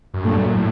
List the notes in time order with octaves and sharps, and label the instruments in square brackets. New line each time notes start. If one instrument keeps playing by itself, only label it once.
[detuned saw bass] F#2
[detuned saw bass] G2 [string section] A#2 F#3 A3
[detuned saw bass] F#2
A2